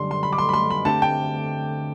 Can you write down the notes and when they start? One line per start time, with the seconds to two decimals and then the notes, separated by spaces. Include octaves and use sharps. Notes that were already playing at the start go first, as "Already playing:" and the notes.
Already playing: F#2 D3 G3 D4 C6
0.11 C6
0.23 B5
0.33 D6
0.38 C6
0.49 B5
0.54 C6
0.70 B5
0.85 D3 A3 C4 G4 A5
1.02 G5